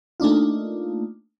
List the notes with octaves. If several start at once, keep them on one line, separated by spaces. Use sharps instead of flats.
A3 A#3 D4 D#4 F4